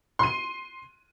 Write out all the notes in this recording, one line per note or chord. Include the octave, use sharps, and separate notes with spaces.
C6 D#7